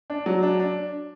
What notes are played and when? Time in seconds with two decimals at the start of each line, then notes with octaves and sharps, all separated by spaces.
0.10 D4
0.26 F#3
0.43 D4
0.60 D4